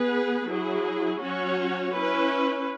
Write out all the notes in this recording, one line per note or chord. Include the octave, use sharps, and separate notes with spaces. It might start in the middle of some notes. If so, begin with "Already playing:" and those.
Already playing: B3 G#4 B4
F#3 E4 G#4
F#3 C#4 F#4 C#5
C#4 E4 B4